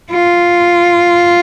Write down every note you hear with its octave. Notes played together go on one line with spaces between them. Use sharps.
F4